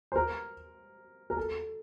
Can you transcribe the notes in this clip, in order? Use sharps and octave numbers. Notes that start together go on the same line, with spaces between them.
C5
A#4
A#4
A4